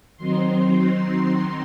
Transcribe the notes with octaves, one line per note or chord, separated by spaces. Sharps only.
D#3 F#3 C4 D#4 C6